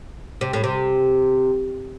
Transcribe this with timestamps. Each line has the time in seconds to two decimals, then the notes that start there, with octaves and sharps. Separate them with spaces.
0.41 C3
0.53 A2
0.64 C3